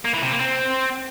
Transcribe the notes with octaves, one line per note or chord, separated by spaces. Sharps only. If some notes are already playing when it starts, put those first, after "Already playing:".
A#3
E3
C3
A#3
C4